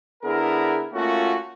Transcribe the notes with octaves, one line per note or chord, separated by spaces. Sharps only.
D3 B3 E4 G#4 A#4
A3 A#3 C#4 F4 F#4